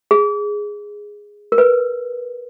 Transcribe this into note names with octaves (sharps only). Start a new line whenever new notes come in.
G#4
A#4
B4